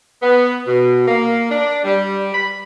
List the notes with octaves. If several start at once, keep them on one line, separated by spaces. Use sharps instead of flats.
B3
B2
A#3
D4
G3
B5